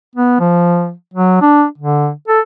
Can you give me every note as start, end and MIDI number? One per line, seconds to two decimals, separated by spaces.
0.16 0.37 59
0.40 0.92 53
1.14 1.38 54
1.42 1.65 62
1.78 2.11 50
2.28 2.40 69